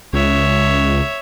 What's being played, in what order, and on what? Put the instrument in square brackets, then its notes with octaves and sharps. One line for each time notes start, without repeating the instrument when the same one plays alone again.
[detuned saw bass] C#2 [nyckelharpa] C#5 E5